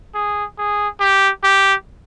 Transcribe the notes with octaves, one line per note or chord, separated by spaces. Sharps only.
G#4
G#4
G4
G4